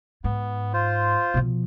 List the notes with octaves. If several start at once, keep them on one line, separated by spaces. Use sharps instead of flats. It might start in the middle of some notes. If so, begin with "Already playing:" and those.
G#2 B3
F4 C5
B2 F3